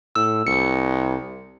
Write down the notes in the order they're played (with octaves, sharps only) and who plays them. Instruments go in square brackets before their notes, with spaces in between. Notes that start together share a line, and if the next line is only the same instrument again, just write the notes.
[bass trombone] A2 [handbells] E6
[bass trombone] C2 [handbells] C#7